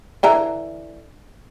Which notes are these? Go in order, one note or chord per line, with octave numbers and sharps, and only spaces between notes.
D3 E3 A#5